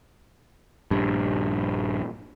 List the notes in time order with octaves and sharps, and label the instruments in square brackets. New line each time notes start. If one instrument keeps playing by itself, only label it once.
[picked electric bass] A#1 G2